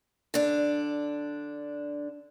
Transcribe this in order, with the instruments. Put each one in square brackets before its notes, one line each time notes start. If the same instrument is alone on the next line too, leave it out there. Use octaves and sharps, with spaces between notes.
[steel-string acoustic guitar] D3 D4